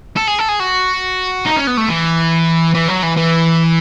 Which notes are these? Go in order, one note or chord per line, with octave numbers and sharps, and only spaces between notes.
A4
G#4
A4
G#4
F#4
D#4
C#4
B3
A3
E3
E3
F#3
E3
E3